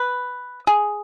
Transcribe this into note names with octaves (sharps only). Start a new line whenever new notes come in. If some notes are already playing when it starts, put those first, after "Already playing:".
Already playing: B4
G#4